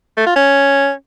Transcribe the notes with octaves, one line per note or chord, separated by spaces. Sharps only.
A3
F4
C#4